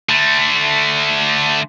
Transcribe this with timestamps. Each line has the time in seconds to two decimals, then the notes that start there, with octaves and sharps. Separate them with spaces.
0.09 D3 A3